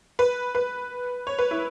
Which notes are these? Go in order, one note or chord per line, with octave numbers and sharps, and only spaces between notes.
B4
B4
C#5
B4
E4